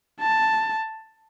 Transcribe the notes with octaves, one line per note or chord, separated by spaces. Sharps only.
A5